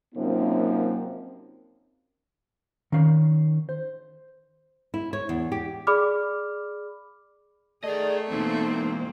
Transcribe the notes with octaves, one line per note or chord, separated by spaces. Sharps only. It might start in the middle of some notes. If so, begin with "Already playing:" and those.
F#2 C3 F3 A#3 C4 D#4
D#3 C#4 F5
C5
E4
C#5
E2
G4
G#4 D5 B5 D6 F6
A3 G#4 A#4 D5 D#5
E2 B2 A#3 C4 D#4